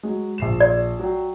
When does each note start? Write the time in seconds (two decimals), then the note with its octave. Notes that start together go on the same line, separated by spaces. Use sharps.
0.03 F#3 G#3
0.38 A#1 C7 E7
0.60 D5
1.00 F#3 G5